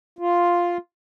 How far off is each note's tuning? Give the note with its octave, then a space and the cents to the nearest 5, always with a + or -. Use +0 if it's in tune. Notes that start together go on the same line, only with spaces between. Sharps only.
F4 +0